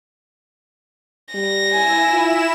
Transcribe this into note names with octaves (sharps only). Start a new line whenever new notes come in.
G3 A#6
E4 G#5 E7
F4